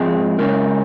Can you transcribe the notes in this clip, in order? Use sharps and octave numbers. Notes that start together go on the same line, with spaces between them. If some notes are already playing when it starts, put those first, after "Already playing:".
Already playing: G#2 F3 G#3 C4 G#4
C#3 G#3 C#4 A#4